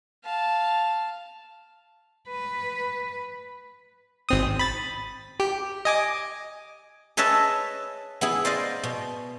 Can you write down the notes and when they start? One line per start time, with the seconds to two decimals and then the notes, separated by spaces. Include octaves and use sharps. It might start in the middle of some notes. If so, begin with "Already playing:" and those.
0.24 F5 A5
2.29 B4
4.29 G#1 C4 D#6
4.59 B5 A6
5.40 G4
5.85 D#5 G#5 D6
7.17 G#4 B4 C#5 D#5 E5 A5
8.21 B3 E4 G#4
8.45 C5 D5 D#5 F5
8.83 B2